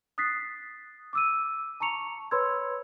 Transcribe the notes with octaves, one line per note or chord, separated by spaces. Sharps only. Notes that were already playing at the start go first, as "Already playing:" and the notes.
D#6 F#6 A6 B6 C7
D6 E6 D#7
A5 A#5 C#6 C#7 F7
B4 C#5 B5 C6 E6 G#6